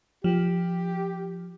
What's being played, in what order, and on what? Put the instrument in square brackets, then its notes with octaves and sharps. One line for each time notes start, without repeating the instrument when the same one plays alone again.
[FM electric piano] F3 [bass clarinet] G4